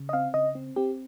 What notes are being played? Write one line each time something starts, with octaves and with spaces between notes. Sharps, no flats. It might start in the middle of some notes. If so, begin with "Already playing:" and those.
Already playing: C#3
D#5
C4 F5
C#3 D#5
C4
C4 G4